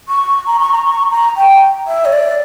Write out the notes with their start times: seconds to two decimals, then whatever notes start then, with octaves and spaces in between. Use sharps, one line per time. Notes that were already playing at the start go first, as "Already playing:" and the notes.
0.09 C#6
0.47 A#5
0.60 C#6
0.72 A#5
0.86 C#6
1.11 A#5
1.36 G5
1.87 E5
2.05 C#5
2.13 D5